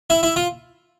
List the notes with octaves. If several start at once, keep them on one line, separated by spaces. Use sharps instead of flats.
E4
E4
F4